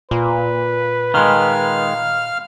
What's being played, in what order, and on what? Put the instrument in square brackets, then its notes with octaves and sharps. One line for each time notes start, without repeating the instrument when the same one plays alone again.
[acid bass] A#2 [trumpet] B4
[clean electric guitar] D#3 G#3 [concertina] F5 F6